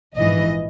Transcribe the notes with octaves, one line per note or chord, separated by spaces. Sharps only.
A#1 G#2 E3 D#5